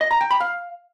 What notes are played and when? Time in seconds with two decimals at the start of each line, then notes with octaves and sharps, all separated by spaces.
0.01 D#5
0.11 A#5
0.21 G5
0.31 B5
0.40 F5